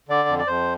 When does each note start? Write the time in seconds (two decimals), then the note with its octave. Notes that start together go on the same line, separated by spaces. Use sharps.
0.09 D3 D5
0.29 F2
0.38 D5
0.47 F2 C5